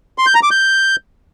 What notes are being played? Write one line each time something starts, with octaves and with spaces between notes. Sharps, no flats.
C6
G6
A#5
D6
G6